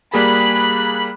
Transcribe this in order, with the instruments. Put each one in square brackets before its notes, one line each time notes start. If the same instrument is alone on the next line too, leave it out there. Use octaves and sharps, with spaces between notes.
[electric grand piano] G3 A#3 G#4 [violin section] B5 F#6 B6